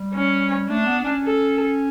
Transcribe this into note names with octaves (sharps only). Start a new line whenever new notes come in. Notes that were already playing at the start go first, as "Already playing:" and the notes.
Already playing: G3
C#4
A3 D4
B3
C#4
A4